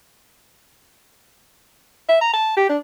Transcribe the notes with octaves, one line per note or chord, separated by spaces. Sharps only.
E5
A#5
A5
G4
D4